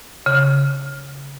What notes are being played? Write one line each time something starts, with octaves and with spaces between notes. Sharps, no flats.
C#3